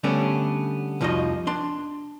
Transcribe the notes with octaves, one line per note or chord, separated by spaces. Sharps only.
D3 G3 A3 B3 C#4 D4
C2 F2 F3 D#4 F#4 D#5
D4 C6